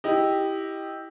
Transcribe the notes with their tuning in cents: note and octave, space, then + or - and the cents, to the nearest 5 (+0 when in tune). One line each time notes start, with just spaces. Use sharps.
E4 -10 G4 +0 D#5 +0